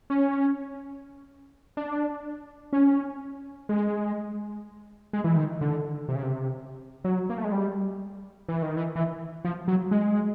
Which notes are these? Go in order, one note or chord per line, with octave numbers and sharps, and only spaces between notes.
C#4
D4
C#4
G#3
G#3
E3
D#3
D3
C3
C#3
C3
F#3
A#3
A3
G#3
G3
E3
D#3
E3
E3
F3
F#3
G#3